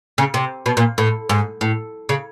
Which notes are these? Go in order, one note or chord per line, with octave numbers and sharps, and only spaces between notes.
C#3
C3
B2
A#2
A2
G#2
A2
C#3